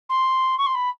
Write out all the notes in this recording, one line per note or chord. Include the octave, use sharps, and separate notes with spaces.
C6
C#6
C6
B5